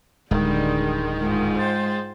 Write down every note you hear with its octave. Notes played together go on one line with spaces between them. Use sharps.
D1 D3 D#3 G3 G#3
G#2 F4
C5 G5 A6